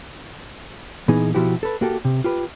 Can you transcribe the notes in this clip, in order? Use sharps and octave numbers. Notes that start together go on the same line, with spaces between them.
A#2 E3 B3 D#4 G#4
B2 F3 E4 F#4 G4
A4 B4
A#3 F#4 G4 A4
C3
F4 G4 B4